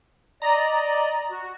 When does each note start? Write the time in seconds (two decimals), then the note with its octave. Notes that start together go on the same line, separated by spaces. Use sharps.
0.42 D5 D#5 A#5
1.31 F#4